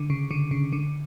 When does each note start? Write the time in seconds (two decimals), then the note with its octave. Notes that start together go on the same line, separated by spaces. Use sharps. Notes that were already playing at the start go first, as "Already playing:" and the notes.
Already playing: D3
0.10 C#3
0.31 D3
0.51 C#3
0.72 D3